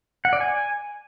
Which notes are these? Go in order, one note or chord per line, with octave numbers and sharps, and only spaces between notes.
F#5
D5
G#5